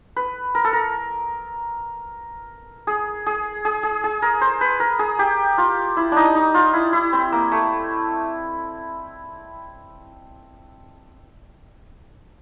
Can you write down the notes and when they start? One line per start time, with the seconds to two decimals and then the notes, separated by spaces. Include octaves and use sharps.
0.16 B4
0.55 A#4
0.64 A4
0.73 A#4
2.87 G#4
3.27 G#4
3.65 G#4
3.83 G#4
4.04 G#4
4.22 A#4
4.41 C5
4.61 B4
4.80 A#4
4.99 G#4
5.19 G4
5.58 F4
5.97 E4
6.12 D4 D#4
6.35 D#4
6.54 F4
6.73 E4
6.93 E4
7.13 C4
7.32 A#3
7.52 A3